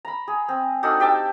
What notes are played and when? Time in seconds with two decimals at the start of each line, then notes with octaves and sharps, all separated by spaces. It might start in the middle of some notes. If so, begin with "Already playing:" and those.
0.05 A#5 B5
0.28 G#4
0.49 C4
0.83 D4 D#4 F#4 A4
1.00 G4 G5 A5 E6